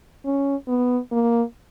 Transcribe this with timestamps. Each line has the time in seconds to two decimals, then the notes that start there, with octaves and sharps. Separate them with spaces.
0.25 C#4
0.68 B3
1.12 A#3